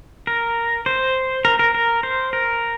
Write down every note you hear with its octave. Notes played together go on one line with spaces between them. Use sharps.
A#4
C5
A#4
A#4
A#4
C5
A#4